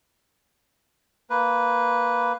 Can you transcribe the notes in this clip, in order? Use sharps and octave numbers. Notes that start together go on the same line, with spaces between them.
A#3 B4